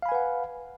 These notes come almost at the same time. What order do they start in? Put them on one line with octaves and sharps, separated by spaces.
F5 B5 G#5 B4 F#5